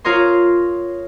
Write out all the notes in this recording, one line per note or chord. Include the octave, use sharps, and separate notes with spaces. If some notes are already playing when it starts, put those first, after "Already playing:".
F4 A#4 C#5 D#5 C6